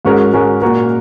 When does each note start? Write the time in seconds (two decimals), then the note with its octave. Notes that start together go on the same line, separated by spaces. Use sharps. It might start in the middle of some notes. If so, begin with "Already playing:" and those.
0.05 G#2 G#3 C#4 F#4 A#4
0.34 G#2 G#3 C#4 F#4 A#4
0.62 A#2 A#3 F#4 A#4